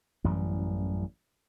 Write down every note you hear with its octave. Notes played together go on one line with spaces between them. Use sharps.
A1 F#2 E3 G3